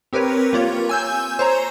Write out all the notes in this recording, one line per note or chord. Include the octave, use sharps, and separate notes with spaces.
C4 G4 A#4 B4 C#5
A#3 F4 C#5
G#5 E6 G6
C5 C#5 A#5